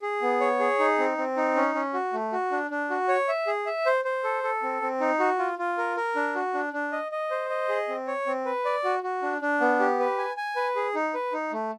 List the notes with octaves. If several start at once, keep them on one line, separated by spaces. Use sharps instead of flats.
G#4
B3
C#5
G#4
D#4
C4
C4
D#4
C#4
C#4
F#4
A3
F#4
D4
D4
F#4
C#5
E5
G#4
E5
C5
C5
A4
A4
C4
C4
D#4
F#4
F4
F4
A#4
A#4
D4
F#4
D4
D4
D#5
D#5
C5
D#5
G#4
C4
C#5
C4
B4
D5
F#4
F#4
D4
D4
B3
G4
B4
G#5
G#5
B4
G#4
D#4
B4
D#4
A3